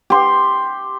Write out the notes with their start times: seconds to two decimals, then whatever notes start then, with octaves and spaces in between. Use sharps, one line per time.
0.10 G4 C6